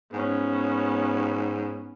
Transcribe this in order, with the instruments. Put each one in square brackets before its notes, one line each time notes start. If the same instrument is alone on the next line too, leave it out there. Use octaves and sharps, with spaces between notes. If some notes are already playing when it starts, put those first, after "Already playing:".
[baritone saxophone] G#2 [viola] B3 C#4